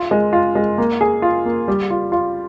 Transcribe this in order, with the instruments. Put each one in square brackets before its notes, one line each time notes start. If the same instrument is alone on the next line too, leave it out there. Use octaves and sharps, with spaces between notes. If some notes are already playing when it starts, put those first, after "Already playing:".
Already playing: [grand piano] F4
G#3
F4
G#3
A#3
G#4
F4
A#3
G3
F4
F4